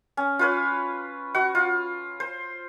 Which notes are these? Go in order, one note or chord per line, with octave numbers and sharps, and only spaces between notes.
C#4
F4 B4 C#5
F#4 F#5
F4
C5